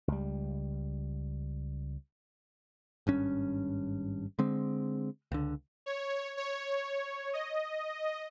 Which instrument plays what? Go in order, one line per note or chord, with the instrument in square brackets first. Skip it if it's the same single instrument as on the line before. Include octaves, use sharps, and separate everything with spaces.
[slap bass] C#2 G3
[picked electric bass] G#1 G2 C#4
D3 G#3 C4
C#2 D3
[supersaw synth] C#5
C#5
D#5